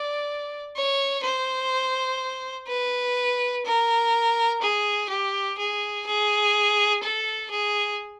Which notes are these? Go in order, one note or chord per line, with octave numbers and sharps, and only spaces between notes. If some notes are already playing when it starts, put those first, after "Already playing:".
Already playing: D5
C#5
C5
B4
A#4
G#4
G4
G#4
G#4
A4
G#4